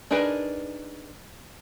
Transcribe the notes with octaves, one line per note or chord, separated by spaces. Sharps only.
D4 D#4 G#4 A#4 B4